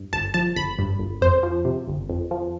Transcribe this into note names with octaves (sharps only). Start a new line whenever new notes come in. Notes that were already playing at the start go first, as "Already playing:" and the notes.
Already playing: G2
G1 A5
F3 A5
G1 B5
G2
G1
F2 C5
F3
C3
G1
F2
F3